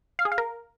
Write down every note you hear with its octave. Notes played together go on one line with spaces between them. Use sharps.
F5
G#4
F5
A#4